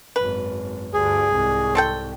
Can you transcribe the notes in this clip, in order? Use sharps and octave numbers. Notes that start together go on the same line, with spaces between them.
G#1 F#2 B4
D2 G2 G#4
C2 G#2
C4 A4 G5